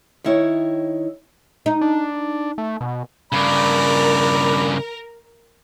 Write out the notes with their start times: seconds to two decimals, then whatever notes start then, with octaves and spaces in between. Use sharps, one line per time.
0.24 D#3 E4 C#5
1.66 D#4
1.81 D4
2.58 A3
2.81 B2
3.32 G2 C#3 A#4 D5 B5